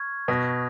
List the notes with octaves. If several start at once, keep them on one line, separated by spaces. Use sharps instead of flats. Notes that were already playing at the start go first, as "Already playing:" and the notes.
Already playing: C#6 F6 G#6
B2 D#6 F#6 A#6